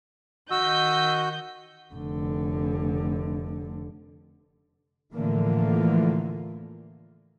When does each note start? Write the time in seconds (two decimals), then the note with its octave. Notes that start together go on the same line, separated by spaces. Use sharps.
0.51 D#3 F#4 D#5 E6 G6
1.94 F1 D3
5.13 A2 D3 E3 F3 A3 A#3